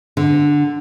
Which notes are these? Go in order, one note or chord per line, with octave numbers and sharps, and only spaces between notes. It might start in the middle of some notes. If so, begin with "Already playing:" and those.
D3